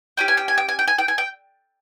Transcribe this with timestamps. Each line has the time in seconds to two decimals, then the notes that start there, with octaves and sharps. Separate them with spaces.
0.17 C#4 G4 G5
0.28 G#5
0.37 G5
0.48 G#5
0.58 G5
0.69 G#5
0.79 G5
0.88 G#5
0.98 G5
1.08 G#5
1.18 G5